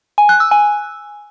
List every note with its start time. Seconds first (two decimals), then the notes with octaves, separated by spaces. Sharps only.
0.18 G#5
0.29 F#6
0.40 E6
0.51 G#5